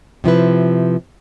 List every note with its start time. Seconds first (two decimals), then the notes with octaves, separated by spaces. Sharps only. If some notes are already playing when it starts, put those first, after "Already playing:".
0.24 C3 F3 E4 B4